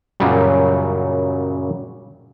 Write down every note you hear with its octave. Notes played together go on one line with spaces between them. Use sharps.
F#2 A#2 C#3 F#3 G3